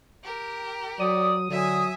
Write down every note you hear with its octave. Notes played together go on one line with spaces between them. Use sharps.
G4 A#4
F#3 C#5 D5 D#6
D3 F#3 E5 G#5